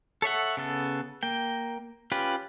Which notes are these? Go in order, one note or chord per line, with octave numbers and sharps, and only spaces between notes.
A4 C#5 E5 F#5
C#3 B3 A4
A#3 G5
C#4 F4 G4 B4